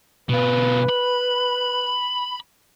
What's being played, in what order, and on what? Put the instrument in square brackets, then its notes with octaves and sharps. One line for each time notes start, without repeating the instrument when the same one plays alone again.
[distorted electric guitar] B2 F4 [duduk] B4
[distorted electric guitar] B5